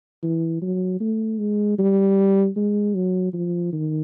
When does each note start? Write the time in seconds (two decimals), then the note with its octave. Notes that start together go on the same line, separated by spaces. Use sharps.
0.23 E3
0.62 F#3
1.00 A3
1.39 G#3
1.79 G3
2.56 G#3
2.95 F#3
3.34 F3
3.73 D#3